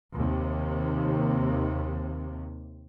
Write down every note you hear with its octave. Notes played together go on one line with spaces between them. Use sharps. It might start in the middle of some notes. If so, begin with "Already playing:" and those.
D#2 C3